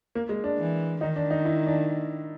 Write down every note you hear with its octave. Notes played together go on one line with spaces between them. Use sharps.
A#3
G#3
D4
E3
D#3 D#4
D4
D#4
E4
D4